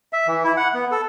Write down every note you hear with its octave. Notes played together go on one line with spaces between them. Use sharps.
E5
E3
E4
F#5
B3
A4